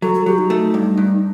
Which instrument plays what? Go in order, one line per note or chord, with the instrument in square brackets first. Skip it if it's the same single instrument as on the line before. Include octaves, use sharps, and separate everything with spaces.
[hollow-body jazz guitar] F#3 [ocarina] A4
[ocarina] A4
[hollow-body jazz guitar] F#3 [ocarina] G4
[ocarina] D#4
[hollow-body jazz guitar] A3
G2
G2